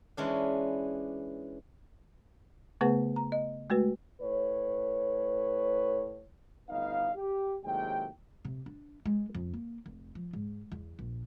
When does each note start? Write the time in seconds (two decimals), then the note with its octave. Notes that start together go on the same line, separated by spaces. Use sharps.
0.17 E3 G#3 C#4 D4
2.81 C#3 A3 B3 G#4 B4 F#5
3.16 A#5
3.32 D#5
3.70 G#3 A3 F#4 B4
4.21 A2 B4 C#5
6.69 G1 A2 B3 D#4 D#5 F5
7.15 G4
7.64 D#2 A2 C3 F#3 G#3 G5
8.45 C3
8.66 D4
9.06 G#3
9.35 F2
9.54 A#3
9.86 F1
10.15 F3
10.33 G#2
10.72 E2
10.99 A#1